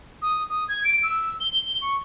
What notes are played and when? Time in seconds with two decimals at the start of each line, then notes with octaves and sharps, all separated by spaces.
0.22 D#6
0.50 D#6
0.68 G#6
0.84 D7
1.03 E6
1.41 G7
1.81 C#6